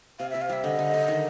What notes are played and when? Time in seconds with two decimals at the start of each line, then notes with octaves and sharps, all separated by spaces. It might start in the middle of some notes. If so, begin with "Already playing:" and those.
0.19 C3 F5
0.30 E5
0.34 C3
0.41 F5
0.49 G3 E5
0.64 D3 D#5
0.79 D3
0.94 D3
1.08 D#3